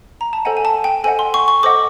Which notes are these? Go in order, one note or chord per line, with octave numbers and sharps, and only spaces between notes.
A#5
A5
A4 C5 D#5 F#5 G#5
G#5
A5
G5
A4 C5 D#5 F#5 G#5
C6
C#6
C#6
A4 C5 D#5 F#5 D6